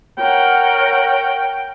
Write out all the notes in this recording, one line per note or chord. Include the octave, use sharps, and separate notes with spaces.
A#4 C#5 F#5 G5